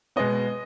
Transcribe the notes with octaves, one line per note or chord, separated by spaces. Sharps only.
B2 G#3 B3 D#5